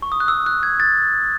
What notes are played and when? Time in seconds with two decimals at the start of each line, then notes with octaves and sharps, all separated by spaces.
0.02 C#6
0.12 D#6
0.20 F#6
0.28 E6
0.46 F#6
0.63 G#6
0.80 A6